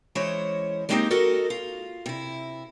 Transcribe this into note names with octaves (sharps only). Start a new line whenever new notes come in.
E3 G#3 C#4 C5 C#5
G3 G#3 A#3 C4 D#4 G4
F#4 A4 A#4 D#5
F4
C3 E4